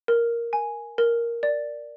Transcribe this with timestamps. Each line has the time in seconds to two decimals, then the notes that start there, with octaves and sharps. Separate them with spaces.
0.08 A#4
0.53 G#5
0.98 A#4
1.43 D5